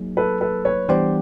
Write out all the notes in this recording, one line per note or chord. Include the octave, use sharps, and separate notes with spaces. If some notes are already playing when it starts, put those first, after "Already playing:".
Already playing: F#3 A#3 D#4 G#4
A4 B4
A4 B4
B4 C#5
E3 G3 B3 D4 G4 C5 D5